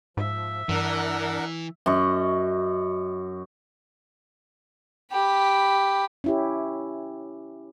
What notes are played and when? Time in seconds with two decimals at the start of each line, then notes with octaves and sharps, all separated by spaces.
0.17 G#2 F3 E5
0.69 G2 E3 D4 A#4 F#5
1.86 F#2 D#5 C#6
5.12 G4 B5
6.24 C#4 E4 G4